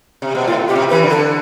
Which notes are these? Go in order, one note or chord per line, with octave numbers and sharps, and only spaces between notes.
C3
B2
A2 F4
B2 G4
C3
E3 B4
D3
A4